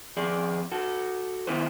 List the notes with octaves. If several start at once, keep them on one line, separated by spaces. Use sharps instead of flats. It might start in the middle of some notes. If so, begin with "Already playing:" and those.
F2 G#4 D5
F#4 A4
D#3 B3 E4 B4 C5